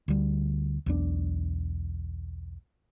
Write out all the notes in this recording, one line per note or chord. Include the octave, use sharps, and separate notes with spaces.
D2 G3
B1 E2 D4